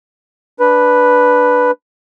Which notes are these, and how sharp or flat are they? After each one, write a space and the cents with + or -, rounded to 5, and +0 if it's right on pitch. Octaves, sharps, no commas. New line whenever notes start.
D4 +0 B4 +0